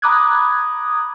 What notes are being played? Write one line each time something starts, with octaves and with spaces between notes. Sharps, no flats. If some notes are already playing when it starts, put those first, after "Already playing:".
A#5 B5 D6 D#6 F#6 G#6